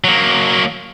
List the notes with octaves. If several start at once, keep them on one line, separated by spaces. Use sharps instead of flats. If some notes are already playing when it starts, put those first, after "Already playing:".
F#3 A#3